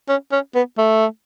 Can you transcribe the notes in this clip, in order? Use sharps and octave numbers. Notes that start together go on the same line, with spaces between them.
C#4
C#4
B3
A3